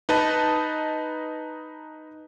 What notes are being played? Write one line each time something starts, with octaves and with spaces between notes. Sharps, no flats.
D#4 B4 D#5 A5